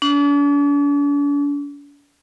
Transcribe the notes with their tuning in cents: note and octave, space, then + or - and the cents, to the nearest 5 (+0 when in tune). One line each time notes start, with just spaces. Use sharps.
D4 -45